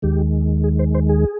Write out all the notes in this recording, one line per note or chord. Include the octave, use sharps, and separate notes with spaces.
D#2 D#3 G#3 G4
G#4
C5
C5
G#4